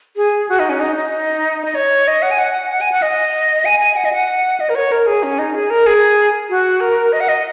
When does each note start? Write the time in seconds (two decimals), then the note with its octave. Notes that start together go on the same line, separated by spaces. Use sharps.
0.17 G#4
0.49 F#4
0.59 D#4
0.69 C#4
0.80 D#4
0.96 D#4
1.65 D#5
1.75 C#5
2.07 D#5
2.22 F#5
2.31 G#5
2.38 F#5
2.71 F#5
2.81 G#5
2.92 F#5
3.02 D#5
3.65 G#5
3.80 G#5
3.96 F#5
4.05 D#5
4.13 F#5
4.60 D#5
4.69 A#4
4.75 C#5
4.92 A#4
5.07 G#4
5.23 C#4
5.39 D#4
5.54 G#4
5.70 A#4
5.86 G#4
6.50 F#4
6.80 A#4
7.13 D#5
7.20 F#5
7.28 D#5